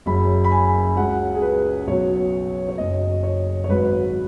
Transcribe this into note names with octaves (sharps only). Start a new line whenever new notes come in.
F#1 F#2 C#3 B5
B5
G#5
C#2 C#3 F#3 F#5
G#4
B4
B1 B2 F#3 C#5
C#5
F#1 F#2 F#3 D#5
C#5
C#5
G#1 G#2 F#3 B4